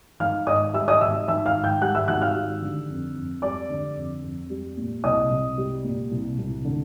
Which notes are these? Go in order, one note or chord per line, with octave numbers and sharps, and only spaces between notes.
D#3 F5 F6
G#2 D#5 D#6
G3 E5 E6
D#5 D#6
G#1 E5 E6
D#3 E5 E6
F5 F6
G#2
G5 G6
G3 F#5 F#6
E5 E6
G#1 F#5 F#6
F5 F6
G3
D3
F2
F2
G3 D5 D6
D3
F2
F2
G3
A#2
C2 D#5 D#6
C2
G3
A#2
C2
C2
D3